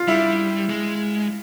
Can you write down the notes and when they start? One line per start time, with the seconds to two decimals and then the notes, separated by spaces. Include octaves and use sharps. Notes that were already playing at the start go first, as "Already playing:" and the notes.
Already playing: F4
0.08 G3 E4
0.70 G#3